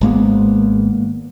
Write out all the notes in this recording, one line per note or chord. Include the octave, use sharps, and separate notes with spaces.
G#1 G#3 A#3 B3